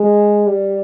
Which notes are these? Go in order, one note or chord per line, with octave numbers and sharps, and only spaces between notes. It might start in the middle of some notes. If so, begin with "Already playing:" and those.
Already playing: G#3
G3